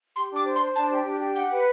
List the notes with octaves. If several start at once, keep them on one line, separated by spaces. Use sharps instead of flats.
G4 C6
D4 D6
C5
C6
C5
D4 A5
G4
D4
G4
F#5 G5
B4